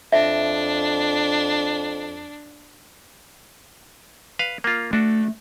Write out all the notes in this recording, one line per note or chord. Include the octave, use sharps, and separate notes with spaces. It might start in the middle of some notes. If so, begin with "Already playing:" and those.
F2 D4 E5
B4 F5
A#3 F4
A3 D4 F#4 A4